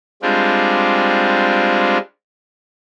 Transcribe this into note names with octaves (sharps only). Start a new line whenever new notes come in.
G3 G#3 C4 D4 F4